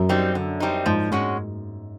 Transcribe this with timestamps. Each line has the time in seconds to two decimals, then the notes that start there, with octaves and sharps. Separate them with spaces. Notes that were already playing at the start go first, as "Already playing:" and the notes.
Already playing: F#2
0.09 G3 C4 D#4
0.35 D3
0.60 G3 C4 D#4
0.86 G#2 F3
1.11 G#2 G#3 C#4 F#4